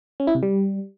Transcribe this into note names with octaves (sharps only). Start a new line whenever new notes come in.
C#4
E4
C3
G3